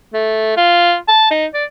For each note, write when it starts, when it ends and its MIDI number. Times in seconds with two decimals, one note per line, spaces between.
0.14 0.53 57
0.57 0.96 65
1.09 1.30 81
1.31 1.46 63
1.54 1.65 74